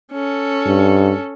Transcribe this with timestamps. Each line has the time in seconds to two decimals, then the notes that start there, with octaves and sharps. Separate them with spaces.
0.13 C#4 A4
0.66 G2